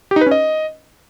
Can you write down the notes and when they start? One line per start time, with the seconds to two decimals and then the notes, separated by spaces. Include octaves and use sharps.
0.11 G4
0.16 D#4
0.21 B4
0.26 C#4
0.31 D#5